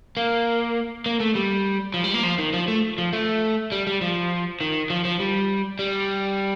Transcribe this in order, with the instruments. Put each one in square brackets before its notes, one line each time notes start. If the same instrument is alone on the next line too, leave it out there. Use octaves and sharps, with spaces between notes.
[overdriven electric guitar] A#3
A#3
A3
G3
F3
G3
A#3
F3
D#3
F3
A3
F3
A3
G3
G3
F3
D#3
F3
F3
G3
G3